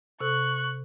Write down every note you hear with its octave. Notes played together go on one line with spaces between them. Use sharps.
C3 A4 C#6 F#6